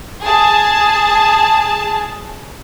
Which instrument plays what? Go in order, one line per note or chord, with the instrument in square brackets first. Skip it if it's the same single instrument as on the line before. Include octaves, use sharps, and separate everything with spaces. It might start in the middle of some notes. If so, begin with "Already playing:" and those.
[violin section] G#4 A5